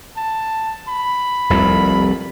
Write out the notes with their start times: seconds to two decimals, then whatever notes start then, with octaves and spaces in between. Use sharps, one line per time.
0.17 A5
0.89 B5
1.50 F1 C2 F2